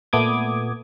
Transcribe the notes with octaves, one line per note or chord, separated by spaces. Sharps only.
A#2 A3 B3 D6 D#6 G#6